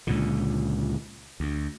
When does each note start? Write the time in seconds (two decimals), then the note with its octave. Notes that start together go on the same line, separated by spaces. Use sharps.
0.07 C#2 A#2 D3
1.40 D2